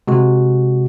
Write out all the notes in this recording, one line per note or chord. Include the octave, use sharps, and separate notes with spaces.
C3 G#3 F#4